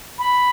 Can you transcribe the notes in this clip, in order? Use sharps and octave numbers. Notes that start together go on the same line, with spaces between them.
B5